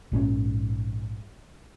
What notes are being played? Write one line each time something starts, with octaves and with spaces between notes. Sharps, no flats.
A#1 G#2 F3 C#4